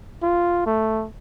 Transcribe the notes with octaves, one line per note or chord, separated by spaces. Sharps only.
F4
A3